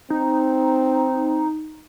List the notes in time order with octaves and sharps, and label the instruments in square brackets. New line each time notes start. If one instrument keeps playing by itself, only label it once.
[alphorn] C4 [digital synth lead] D#4